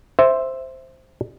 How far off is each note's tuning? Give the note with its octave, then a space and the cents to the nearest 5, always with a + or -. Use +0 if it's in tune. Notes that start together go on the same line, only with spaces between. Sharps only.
C5 +0 E5 +0